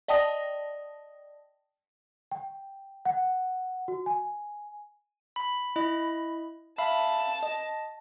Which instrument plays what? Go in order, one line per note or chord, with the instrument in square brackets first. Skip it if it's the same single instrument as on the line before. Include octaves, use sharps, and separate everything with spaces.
[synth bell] D5 D#5 G5 A5 D#6 A#6
[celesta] G5
F#5
F#4
G#5
[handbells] B5
E4 D#5 B5
[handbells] E5 F5 B5 [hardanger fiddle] A5
[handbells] D#5